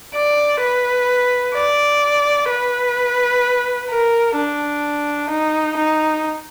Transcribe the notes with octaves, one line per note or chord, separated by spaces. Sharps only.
D5
B4
D5
B4
A#4
D4
D#4
D#4